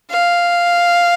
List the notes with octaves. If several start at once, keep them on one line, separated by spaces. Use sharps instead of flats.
F5